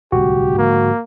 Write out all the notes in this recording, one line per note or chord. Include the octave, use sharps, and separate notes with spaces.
D1 C2 F#4 G4
G#2 D3 F3 A#3